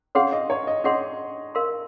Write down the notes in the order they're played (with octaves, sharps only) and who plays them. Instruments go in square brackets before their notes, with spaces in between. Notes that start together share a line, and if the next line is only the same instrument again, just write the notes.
[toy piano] C#4 G#4 C#5 F#5 C6 [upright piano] F5
[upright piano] D#5
C#5
D#5
[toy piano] C#4 G#4 C#5 F#5 C6 [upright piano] D#5
[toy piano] A#4 F5 C6